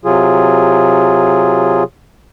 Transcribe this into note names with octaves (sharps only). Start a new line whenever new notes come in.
C3 F#3 F4 G#4